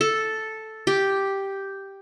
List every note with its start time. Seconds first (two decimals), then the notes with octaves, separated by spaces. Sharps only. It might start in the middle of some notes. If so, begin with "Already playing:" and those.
0.01 A4
0.87 G4